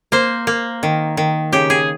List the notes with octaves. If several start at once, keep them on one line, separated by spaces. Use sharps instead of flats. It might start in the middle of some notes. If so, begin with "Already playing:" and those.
A#3 C5
A#3
D#3
D#3
C#3 G4
G#4